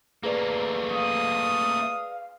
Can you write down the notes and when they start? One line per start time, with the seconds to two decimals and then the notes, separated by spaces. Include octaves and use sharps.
0.23 A3 A#3 G#4 B4 D5
0.92 F5 D#6